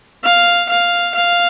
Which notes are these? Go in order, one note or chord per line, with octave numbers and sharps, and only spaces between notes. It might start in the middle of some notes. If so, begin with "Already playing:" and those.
F5
F5
F5